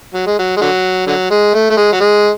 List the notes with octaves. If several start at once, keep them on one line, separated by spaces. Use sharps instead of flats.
F#3
G#3
F#3
G#3
D3 F#3
D3 F#3
G#3
A3
A3
G#3
F#3
G#3